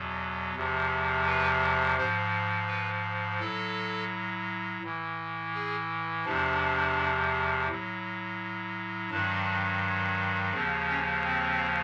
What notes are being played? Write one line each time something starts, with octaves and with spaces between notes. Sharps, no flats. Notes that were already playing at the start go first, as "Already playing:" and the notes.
Already playing: E2 B2 F#3
E2 C3 F3
B4
G#2 F3 C5
B4
A2 F#3 A4
A2 E3
G#4
E2 C3 F3 D4
A2 F#3
G2 D#3 F#3 D4
D#2 C#3 F3 C4
C#4
C4